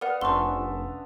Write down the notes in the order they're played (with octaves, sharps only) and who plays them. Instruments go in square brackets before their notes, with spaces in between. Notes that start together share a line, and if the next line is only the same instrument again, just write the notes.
[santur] B3 F5 D#6 [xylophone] A#4 D5 F#5
[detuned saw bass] F1 [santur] C#4 D4 E5 [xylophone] C5 G7 [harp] C6 C#6